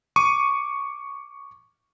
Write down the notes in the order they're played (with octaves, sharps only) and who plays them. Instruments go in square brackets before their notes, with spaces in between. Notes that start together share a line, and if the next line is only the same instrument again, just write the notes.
[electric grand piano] C#6 D6 D#7